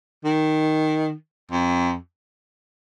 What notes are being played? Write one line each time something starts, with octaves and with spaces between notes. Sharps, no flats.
D#3
F2